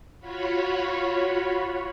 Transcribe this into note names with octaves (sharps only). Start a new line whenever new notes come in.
F4 F#4 C#5 B5